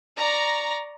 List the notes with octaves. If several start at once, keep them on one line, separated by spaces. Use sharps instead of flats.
D5 A#5 C#6